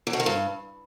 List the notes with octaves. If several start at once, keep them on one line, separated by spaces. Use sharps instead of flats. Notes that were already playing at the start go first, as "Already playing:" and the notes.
E2
B2
D#3
G2